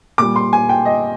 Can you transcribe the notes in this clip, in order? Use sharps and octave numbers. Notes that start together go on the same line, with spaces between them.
A#2 G3 D6
C6
G#5
G5
D#5